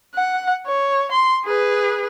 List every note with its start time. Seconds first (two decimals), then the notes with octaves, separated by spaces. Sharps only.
0.15 F#5
0.66 C#5
1.12 C6
1.45 G#4 B4